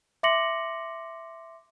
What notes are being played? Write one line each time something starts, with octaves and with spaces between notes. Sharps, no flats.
E5 C6 D6 A#6 C#7 F#7